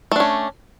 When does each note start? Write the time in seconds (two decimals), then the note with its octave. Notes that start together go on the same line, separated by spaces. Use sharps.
0.12 A3
0.16 D4
0.20 C#4